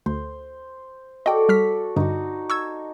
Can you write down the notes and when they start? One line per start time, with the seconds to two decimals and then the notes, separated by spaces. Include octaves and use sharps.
0.06 D2 C5
1.26 F#4 A4 D5 D#5 G5
1.49 G3 F6 B6
1.96 G2 D3 D#4 F#4
2.50 C#6 E6 G#6